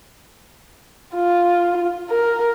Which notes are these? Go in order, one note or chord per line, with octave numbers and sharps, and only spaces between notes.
F4
A#4